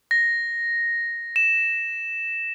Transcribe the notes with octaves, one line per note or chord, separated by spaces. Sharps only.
A#6
E7